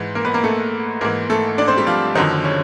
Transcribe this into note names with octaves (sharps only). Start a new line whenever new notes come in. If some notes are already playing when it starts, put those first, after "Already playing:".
Already playing: G#2 E3
A#3 A#4
B3 B4
A#3 A#4
A3 A4
G#2 E3 A#3 A#4
A3 A4
D4 D5
C4 C5
G3 G4
F3 F4
F#2 D3 D#3 F3 D#4
C#3 C#4